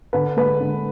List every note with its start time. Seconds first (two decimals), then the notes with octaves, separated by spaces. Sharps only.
0.13 D3 B4
0.37 G#3 B4
0.60 D3